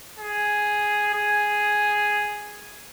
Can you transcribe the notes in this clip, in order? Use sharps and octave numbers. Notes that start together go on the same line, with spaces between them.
G#4
G#4